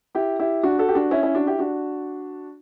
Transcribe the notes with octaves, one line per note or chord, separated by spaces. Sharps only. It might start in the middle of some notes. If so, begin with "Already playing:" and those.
E4 G4
E4 G4
D4 F#4
F#4 A4
G4
D4 F#4
C#4 E4
C#4 E4
D4 F#4
E4 G4
D4 F#4